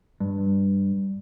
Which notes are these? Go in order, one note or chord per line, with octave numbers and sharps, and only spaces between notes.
G2